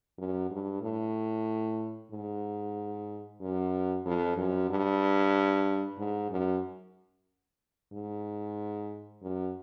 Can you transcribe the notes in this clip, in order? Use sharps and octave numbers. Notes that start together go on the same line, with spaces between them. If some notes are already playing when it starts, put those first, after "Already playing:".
F#2
G2
A2
G#2
F#2
F2
F#2
G2
G#2
F#2
G#2
F#2